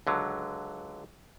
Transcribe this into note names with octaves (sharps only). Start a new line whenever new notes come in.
C#2 D3 F#3